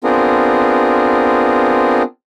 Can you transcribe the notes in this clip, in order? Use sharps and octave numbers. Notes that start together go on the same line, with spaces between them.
B3 C4 D4 F4 G#4 A#4